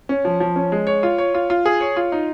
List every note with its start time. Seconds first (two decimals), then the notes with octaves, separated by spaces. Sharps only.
0.09 C#4
0.25 F3
0.40 F3
0.56 C#4
0.72 G#3
0.87 C#5
1.03 F4
1.18 C#5
1.34 F4
1.50 F4
1.66 G#4
1.80 C#5
1.96 F4
2.12 D#4